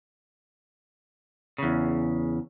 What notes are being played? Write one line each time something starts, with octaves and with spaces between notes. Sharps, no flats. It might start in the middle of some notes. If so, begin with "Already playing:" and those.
E2 C#3